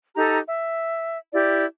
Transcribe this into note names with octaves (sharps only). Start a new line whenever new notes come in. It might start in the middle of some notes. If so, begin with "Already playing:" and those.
D#4 G4 A4 A#5
E5
E4 G4 D5